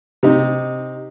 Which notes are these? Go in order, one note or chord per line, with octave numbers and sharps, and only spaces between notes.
C3 D#4